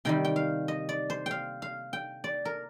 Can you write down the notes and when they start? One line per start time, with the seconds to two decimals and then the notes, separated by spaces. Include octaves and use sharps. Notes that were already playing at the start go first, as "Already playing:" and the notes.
0.05 C3 D#3 G3 G5
0.25 G5
0.36 F5
0.68 D#5
0.89 D5
1.10 C5
1.26 F5 G5
1.62 F5
1.93 G5
2.24 D5
2.45 A#4